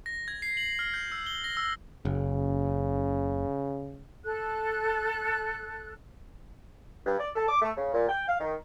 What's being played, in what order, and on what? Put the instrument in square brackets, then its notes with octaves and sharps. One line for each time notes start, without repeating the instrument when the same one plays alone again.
[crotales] A#6
G#6
C7
F#7
F6
G6
E6
G7
A#6
E6
[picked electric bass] F#1 [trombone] C#3
[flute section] A4 F#6
[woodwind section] G2
D5
A4
D6
A3
C#3
A#2
G5
F5
D#3